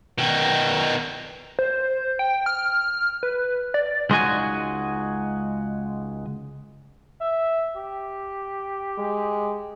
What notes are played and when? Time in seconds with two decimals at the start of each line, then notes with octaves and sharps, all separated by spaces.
0.18 B2 D#3
1.59 C5
2.19 G5
2.46 F6
3.23 B4
3.74 D5
4.10 C#2 G#3 D#4 F#4 G#5
7.21 E5
7.76 G4
8.99 G#3